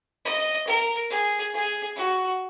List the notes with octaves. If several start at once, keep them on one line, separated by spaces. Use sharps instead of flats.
D#5
A#4
G#4
G#4
F#4